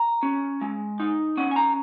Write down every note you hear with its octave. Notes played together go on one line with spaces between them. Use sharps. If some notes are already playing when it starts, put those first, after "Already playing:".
Already playing: A#5
C#4
G#3
D#4
C#4 F#5
G#5
A#5